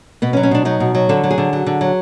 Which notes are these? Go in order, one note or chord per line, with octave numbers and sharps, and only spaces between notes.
B2 B3
C#4
F#3
C#4
B2 D4
F#3 D#4
B2
F#3
D3 A4
F#3
G#4
D3
F#3
D3
F#3